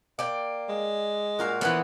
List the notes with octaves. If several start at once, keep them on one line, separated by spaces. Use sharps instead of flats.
A#3 D5 G5
G#3
A#2 F#4 A#4 F5
E3 F3 B3 B4 F#5